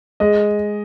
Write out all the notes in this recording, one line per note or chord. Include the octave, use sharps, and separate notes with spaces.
G#3 D#5